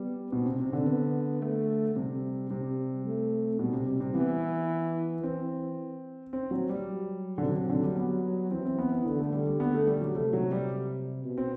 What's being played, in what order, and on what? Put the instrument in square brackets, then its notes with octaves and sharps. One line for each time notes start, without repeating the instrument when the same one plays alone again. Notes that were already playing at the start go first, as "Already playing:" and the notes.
Already playing: [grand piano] G3 [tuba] B3
[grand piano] B2 [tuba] C4
[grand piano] C3
C3
D3
[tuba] B3
A3
[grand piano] C3 [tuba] G3
[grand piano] C3 [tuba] G3
[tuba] A3
[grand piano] B2 [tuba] G3
[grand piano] C3
C3
C3
[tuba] E3 [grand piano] B3
[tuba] E3 [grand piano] C4
[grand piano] C4
F#3
G3
[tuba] F#3
[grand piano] D3
[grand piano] C3 [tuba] F#3
[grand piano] C3
D3
G3
B3
[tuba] E3 [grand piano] C4
[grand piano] C4
B3
B3
[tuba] D3 [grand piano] B3
[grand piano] A3
G3
G3
[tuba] D3 [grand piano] B3
[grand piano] A3
G3
F#3
[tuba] C3 [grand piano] A3
[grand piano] F#3
G3
[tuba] B2
[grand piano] C4